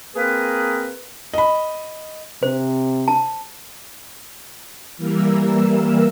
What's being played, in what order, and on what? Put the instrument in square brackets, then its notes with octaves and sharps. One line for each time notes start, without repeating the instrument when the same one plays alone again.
[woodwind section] A#3 C4 G#4 A#4 B4
[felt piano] D#5 B5
[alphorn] C3 [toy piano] C5
[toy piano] A5
[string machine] E3 G3 A#3 A#4 E6